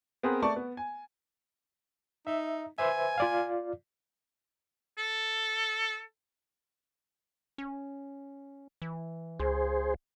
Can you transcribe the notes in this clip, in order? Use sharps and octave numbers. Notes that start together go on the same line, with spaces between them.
B3 C4 G#4 A#4 B4
A3 D5 A5 C#6
B3
G#5
D#4 E5
B4 C5 E5 G#5
F4 D5 F5
A4
C#4
E3
C#2 G#4 C5